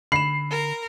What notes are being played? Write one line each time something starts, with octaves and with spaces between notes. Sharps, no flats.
D3 B5 C7 E7
A#4